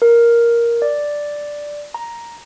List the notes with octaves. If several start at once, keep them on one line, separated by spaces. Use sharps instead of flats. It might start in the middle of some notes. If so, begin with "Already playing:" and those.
A#4
D5
A#5